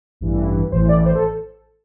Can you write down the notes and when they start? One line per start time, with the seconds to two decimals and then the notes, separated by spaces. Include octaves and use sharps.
0.21 A1 G2 E3
0.72 A1 A2 E3 C5
0.89 D5
1.05 C5
1.15 A4